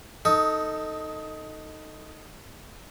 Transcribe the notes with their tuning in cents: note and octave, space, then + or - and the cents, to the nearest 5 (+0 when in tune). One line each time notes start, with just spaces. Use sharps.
D#4 +0 A4 +15 D#6 +20